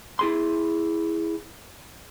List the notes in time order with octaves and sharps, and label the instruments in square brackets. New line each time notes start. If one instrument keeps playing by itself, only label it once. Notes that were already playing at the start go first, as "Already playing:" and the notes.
[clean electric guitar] E4 G#4 C6